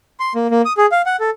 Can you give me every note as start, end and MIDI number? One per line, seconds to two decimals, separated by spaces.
0.20 0.33 84
0.35 0.47 58
0.51 0.62 58
0.65 0.73 87
0.77 0.86 68
0.92 1.02 77
1.06 1.16 78
1.20 1.30 69